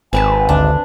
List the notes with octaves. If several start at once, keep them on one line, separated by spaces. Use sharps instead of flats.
G#1 C4 B4 G#5 A5
D2 D4